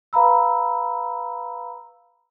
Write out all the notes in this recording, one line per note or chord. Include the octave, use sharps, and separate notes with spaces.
B4 F5 A#5 B5 E6